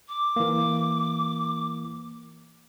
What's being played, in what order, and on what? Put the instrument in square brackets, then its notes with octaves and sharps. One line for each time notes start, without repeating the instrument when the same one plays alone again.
[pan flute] D6
[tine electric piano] E3 A#3